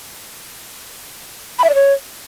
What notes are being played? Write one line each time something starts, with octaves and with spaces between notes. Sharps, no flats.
B5
E5
D5
C#5